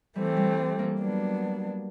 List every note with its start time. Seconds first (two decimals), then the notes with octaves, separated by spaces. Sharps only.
0.16 E3 G3 A3 C4
0.37 G3
0.79 A#3
1.00 F#3 B3 D4